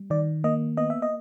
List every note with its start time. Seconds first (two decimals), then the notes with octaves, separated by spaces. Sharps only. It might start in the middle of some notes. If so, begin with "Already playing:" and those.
Already playing: G3
0.10 D#3 D5
0.44 A#3 D#5
0.77 B3 D#5
0.90 E5
1.02 D#5